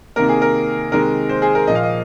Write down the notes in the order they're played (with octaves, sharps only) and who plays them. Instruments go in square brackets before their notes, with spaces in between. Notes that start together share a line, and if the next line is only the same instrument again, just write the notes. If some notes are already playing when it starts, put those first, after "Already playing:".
[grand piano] C3 D#3 A#3 A#4
G#4
A#4
C3 D#3 G#3 A#4
C5
G#4
A#4
A#2 F3 A#3 D#5
F5
D#5